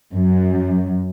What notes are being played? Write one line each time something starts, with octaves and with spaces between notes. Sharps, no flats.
F#2